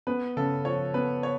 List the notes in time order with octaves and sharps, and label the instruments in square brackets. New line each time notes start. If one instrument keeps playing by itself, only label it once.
[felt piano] B3 [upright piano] B4
[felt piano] C#3 [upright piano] A4
[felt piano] F3 [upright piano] C#5
[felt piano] B3 [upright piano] B4
[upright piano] C#5